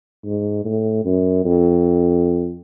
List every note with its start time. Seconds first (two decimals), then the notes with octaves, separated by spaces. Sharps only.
0.25 G#2
0.65 A2
1.05 F#2
1.45 F2